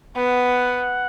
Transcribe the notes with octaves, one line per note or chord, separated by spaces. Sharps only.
B3 F#5